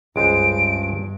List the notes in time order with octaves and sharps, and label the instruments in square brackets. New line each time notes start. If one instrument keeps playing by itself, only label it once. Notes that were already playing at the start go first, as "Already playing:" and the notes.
[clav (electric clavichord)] C#2 G#3 C5 [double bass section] G2 [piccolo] D7